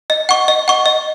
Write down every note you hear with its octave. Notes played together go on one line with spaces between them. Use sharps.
D#5
F#5 C#6
D#5
F#5 C#6
D#5